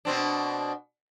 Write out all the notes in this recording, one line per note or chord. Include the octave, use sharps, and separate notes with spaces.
B2 C4 D4